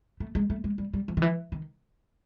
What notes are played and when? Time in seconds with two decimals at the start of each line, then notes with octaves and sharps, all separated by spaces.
0.20 A3
0.35 G#3
0.50 A3
0.64 G#3
0.78 G3
0.93 G3
1.08 F3
1.17 D#3
1.22 E3
1.52 D#3